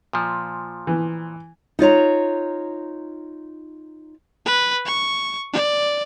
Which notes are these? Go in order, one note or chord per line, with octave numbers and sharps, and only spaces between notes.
A#2 F3
E3
D#4 F4 C#5 A#5
B4
C#6
D5